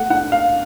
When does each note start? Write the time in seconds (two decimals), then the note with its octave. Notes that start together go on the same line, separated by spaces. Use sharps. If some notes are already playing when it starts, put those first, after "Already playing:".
Already playing: A3 F#5
0.10 D4 F#5
0.32 F5